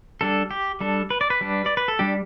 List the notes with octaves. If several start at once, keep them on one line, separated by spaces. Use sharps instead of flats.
G3 D4 A4
G4
G3 D4 A4
B4
D5
B4
G3 D4
D5
B4
A4
G3 D4 G4